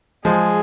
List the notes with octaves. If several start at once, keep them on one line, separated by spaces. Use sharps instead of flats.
F3 G#3 G#4